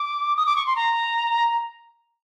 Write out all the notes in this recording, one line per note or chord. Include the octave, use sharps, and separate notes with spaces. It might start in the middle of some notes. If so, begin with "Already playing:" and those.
Already playing: D6
D#6
D6
C#6
C6
A#5